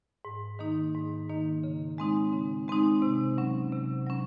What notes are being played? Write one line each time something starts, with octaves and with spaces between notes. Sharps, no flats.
G#2
D#3 A#3 D#4
G#2
D#3 A#3 D#4
C#3
G#3 C4 D#4
C#3
G#3 C4 D#4
C3
F#3 C#4
C3
F#3 C#4